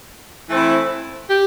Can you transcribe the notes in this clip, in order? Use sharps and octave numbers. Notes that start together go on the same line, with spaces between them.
E3 A3 C4 E4
G4